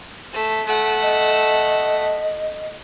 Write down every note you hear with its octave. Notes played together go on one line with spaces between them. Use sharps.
A3
A3 F#5
D#5